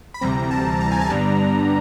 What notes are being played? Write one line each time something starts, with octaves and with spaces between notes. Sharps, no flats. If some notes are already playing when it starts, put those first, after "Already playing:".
B5
D2 C3 E3 G3 C4 A#5
A5
A#5
G#5
A5
G2 D3 G3 B3 D4 A#5